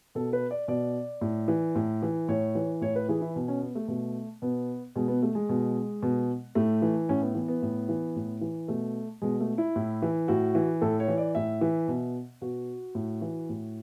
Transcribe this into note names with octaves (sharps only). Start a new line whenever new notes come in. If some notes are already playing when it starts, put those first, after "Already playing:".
B2 A4
B4
D5
B2 D5
A2
E3
A2
E3
A2 C#5
E3
A2 C#5
B4
E3 G#4
E4
B2
C#4
B3
A3
B2 A3
B2 B3
B2 G#3
B3
A3
G#3
B2
B2
A2 A3
E3
A2 C#4
B3
E3 B3
B3
A2
E3
A2
E3
B2 A3
B2 G#3
A3
E4
A2
E3
A2 F#4
E3
A2 A4
C#5
E3
D5
A2 E5
E3
B2
B2 F#4
A2
E3
A2